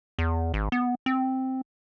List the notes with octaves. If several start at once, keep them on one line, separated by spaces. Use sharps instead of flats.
E2
G#1
B3
C4